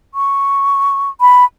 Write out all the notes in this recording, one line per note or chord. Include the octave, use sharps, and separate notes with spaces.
C#6
B5